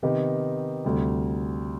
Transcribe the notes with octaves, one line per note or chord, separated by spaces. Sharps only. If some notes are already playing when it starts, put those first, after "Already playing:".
C3 D#3 B3 D#4 G4
D2 C3 G3